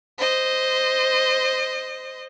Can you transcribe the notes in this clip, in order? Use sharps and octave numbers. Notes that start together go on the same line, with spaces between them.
C5 D#5